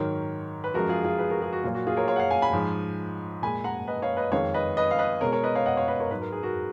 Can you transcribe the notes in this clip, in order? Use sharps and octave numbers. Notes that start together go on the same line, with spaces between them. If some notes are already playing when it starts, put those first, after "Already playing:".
Already playing: G#2 D#3 F#3 A#4 C#5
B4
F#2 F3 G#3 F#4 A#4
F4 G#4
F4 G#4
G#4 B4
F#4 A#4
F4 G#4
F#4
A#2 F#3 F4
F#4
F4 G#4
A#4 C#5
C#5 F5
F#5
C#5 F5
F5 G#5
G#5 B5
G#2 F3 G#3
A#2 G#3 G#5 B5
F#5 A#5
B4 D#5
C#5 F5
B4 D#5
F2 D#3 G#3 C#5 F5
B4 D#5
B4 D#5
F5
B4 D#5
B2 G#3 A#4 C#5
A#4 C#5
B4 D#5
C#5 F5
D#5 F#5
C#5 F5
B4 D#5
A#4 C#5
G#2 F#3 B4
A#4
G#4
F#4 A#4